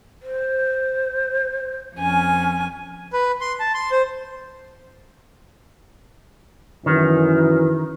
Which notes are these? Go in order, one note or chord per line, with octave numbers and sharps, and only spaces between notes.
C5
F2 C#4 G#5
B4
C6
A5
C6
C5
F#2 D#3 E3